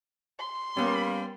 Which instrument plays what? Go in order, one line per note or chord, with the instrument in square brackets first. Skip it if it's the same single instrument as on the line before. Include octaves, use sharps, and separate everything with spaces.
[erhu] C6
[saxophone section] G3 A#3 [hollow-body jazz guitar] B3 C#4